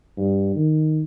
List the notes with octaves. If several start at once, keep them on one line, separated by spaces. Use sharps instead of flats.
G2
D#3